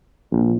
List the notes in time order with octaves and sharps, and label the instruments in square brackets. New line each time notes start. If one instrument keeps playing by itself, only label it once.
[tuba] A#1